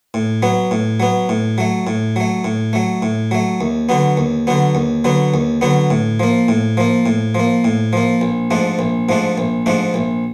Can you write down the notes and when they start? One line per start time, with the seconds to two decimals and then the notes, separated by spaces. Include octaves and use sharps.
0.14 A2
0.43 F#3 B3
0.71 A2
1.00 F#3 B3
1.29 A2
1.58 F#3 A3
1.87 A2
2.16 F#3 A3
2.44 A2
2.73 F#3 A3
3.02 A2
3.31 F#3 A3
3.61 D#2
3.89 D3 F#3 B3
4.17 D#2
4.47 D3 F#3 B3
4.75 D#2
5.04 D3 F#3 B3
5.34 D#2
5.61 D3 F#3 B3
5.90 A2
6.20 F3 A#3
6.48 A2
6.77 F3 A#3
7.06 A2
7.35 F3 A#3
7.64 A2
7.93 F3 A#3
8.21 A#1
8.51 G#2 F3 A3 D4
8.79 A#1
9.09 G#2 F3 A3 D4
9.38 A#1
9.66 G#2 F3 A3 D4
9.94 A#1